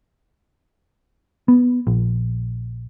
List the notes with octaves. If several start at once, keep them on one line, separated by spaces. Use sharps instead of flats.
B3
A#1